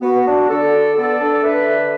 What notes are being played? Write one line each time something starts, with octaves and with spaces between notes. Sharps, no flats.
B3 F#4
D4
D3 A4 D5
D3
B3 A4 D5
D4
D3 B4 E5
D3